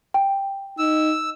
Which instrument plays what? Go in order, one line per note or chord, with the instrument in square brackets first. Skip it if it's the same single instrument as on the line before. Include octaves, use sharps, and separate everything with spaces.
[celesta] G5
[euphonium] D#4 [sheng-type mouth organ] E6